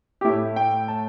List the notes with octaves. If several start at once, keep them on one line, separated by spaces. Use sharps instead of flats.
G4
A2 A3 E4
G5
A5